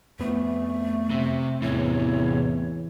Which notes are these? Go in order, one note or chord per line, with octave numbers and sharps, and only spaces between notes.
F2 A3 B3
C3
E2 A2 C3 E3 C#5